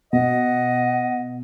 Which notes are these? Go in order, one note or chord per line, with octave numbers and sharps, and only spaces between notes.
B2 D#5 F#5